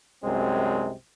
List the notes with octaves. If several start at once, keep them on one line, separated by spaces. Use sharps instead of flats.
C2 F#2 C3 G#3 C4